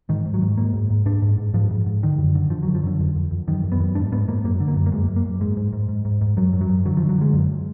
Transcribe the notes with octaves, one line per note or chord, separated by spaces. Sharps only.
G#2 D#3
G#2
F#3
G#2
G#2 A#3
G#2
G#2
G#2 D4
G#2
G#2
G#2 F3
G#2
G#2
D3 D#3
F#2
D3
D3 F3
F#3
F#2
F3
F#2 D3
F2
F2
F2
F#2 D#3
F#2
B3
F#2
G#2 D4
G#2 B3
G#2 A#3
F#2 A#3
D3
A#3
F#2
A#3
F#2 G#3
F#2
A#3
F#2
G#2 G#3
G#2
G#2
G#2
G#2
G#2
F#2 F#3
F#2
F#3
F#2
D3 F#3
F3
D3
F#3
D3 G#3
F#2